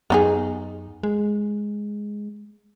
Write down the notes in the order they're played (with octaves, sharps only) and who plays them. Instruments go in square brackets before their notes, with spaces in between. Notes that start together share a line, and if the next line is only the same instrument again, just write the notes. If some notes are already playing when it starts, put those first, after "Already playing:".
[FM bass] F#2 [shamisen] B3 D#4 G#4
[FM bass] G#3